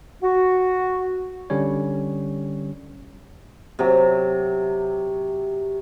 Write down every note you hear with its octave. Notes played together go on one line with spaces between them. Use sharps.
F#4
D3 G3 C#4 C#5
C3 F#3